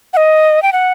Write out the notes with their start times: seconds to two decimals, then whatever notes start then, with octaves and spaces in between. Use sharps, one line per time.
0.13 F#5
0.17 D#5
0.62 G5
0.73 F#5